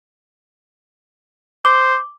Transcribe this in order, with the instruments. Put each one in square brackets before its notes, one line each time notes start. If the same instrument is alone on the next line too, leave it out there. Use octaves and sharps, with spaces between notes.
[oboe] C5 [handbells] D6